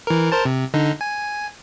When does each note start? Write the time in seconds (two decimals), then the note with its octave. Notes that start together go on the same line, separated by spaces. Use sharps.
0.07 E3 A#4
0.32 A#4 C5 A5
0.45 C3
0.74 D3 D#4
1.01 G#5